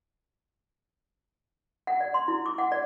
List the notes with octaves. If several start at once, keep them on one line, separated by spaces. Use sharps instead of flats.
F#5
D5
C6
E4
D6
F#5
D5